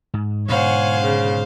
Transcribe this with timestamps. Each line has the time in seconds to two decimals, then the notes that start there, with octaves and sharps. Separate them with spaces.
0.14 G#2
0.49 G#2 B2 D3 C5 C#5 F5 F#5 G#5
1.00 C#3